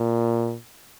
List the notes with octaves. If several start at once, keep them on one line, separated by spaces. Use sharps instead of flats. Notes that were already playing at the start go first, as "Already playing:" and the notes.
Already playing: A#2